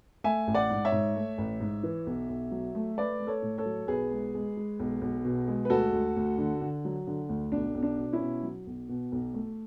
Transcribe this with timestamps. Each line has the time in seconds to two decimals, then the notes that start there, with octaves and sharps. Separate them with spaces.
0.24 A3 E5 G#5
0.47 A1
0.54 D5 F#5
0.70 G#2
0.85 C#5 E5
0.92 G#2
1.15 A3
1.38 A1
1.60 G#2
1.83 E3
2.07 B1
2.29 B1
2.51 F#3
2.75 A3
2.98 A3 B4 D5
3.20 A3
3.27 A4 C#5
3.42 A2
3.58 A4 C#5
3.65 F#3
3.88 B1 G#4 B4
4.11 G#3
4.34 G#3
4.57 G#3
4.79 B1
5.02 B1
5.25 B2
5.48 G#3
5.65 B4
5.70 D2 F#4 A4
5.93 D2
6.16 D2
6.38 D3
6.61 D3
6.85 F#3
7.07 D3
7.29 D2
7.52 B1 D4
7.75 B1
7.83 D4
7.98 B2
8.13 C#4 E4
8.21 B2
8.43 F#3
8.67 B1
8.89 B2
9.12 B1
9.34 A3